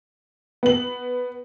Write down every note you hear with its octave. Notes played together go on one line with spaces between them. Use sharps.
B3 F#7